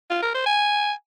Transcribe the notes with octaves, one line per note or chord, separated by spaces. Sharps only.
F4
A#4
C5
G#5